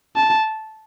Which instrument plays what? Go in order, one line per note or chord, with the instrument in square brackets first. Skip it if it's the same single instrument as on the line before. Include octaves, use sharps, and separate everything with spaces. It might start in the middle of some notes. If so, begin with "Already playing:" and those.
[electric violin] A5